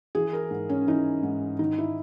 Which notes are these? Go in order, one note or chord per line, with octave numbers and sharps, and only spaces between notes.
E3 G#4
A#4
G#2
C#4
E3 D#4
G#2
D#3 D#4
E4